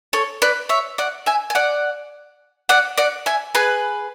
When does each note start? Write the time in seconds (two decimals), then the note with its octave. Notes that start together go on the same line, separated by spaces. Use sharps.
0.13 A4 C#5
0.42 B4 D5
0.69 C#5 E5
0.98 D5 F#5
1.26 E5 G#5
1.50 G#5
1.55 D5 F#5
2.69 D5 F#5
2.98 D5 F#5
3.26 E5 G#5
3.55 G#4 B4